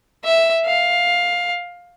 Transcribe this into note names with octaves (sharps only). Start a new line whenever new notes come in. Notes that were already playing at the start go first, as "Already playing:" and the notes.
E5
F5